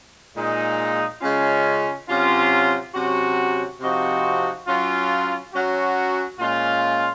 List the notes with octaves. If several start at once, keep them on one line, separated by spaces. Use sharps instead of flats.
A#2 G#3 D#4
C#3 G#3 C#4 F4
C3 F#3 C#4 F4
C3 F#3 C#4 F#4
C3 F3 C4 D#4 F#4
F#3 C#4 F4
F#3 C#4 F#4
A#2 G#3 C#4 F4